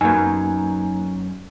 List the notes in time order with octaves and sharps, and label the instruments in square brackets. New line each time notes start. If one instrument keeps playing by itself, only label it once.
[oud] F#2 B3 [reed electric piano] A#3 G#5 [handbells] D#4